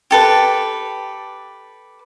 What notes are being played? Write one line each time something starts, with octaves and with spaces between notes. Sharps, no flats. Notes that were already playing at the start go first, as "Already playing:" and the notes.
G4 A4 B4